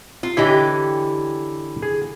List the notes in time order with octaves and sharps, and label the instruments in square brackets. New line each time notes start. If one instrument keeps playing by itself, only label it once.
[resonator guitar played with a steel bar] F4
[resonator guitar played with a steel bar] D3 E3 G4 [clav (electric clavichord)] E4 C#5 D#5
[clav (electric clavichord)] G#4